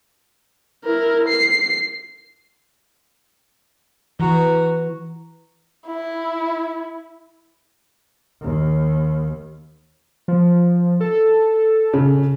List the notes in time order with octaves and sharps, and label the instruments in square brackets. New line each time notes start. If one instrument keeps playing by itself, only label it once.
[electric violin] E4 A#4
C7
[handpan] E3 [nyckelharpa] F#4 A#5
[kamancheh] E4
[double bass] D#2
[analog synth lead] F3
A4
[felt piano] C#3